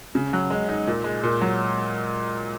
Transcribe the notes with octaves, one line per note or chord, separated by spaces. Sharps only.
C#3
F#3
G#3
D#4
A#2
G#3
A#2
F#3